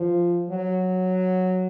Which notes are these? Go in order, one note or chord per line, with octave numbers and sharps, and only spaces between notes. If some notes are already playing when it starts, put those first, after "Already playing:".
Already playing: F3
F#3